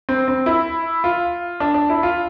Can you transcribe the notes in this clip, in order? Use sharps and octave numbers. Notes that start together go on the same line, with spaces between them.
C4
C4
E4
F4
D4
D4
E4
F4